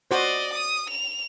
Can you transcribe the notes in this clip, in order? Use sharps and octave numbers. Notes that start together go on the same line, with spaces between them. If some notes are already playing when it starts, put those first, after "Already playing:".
F#4 C5 D5 D#5
D#6
F7